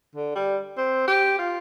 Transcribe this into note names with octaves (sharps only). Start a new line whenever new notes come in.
D3
G3
C4
G4
F4